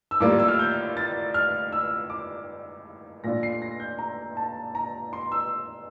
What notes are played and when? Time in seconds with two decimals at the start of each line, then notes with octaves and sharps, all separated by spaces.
0.11 E6
0.20 A2 G3 A#3 F4 D6
0.39 E6
0.48 F6
0.59 G6
0.97 A6
1.34 F6
1.72 E6
2.10 D6
3.24 A#2 A3 D4 F4 A#6
3.43 C7
3.62 A#6
3.80 G6
3.99 A#5
4.37 A5
4.75 A#5
5.13 C6
5.32 E6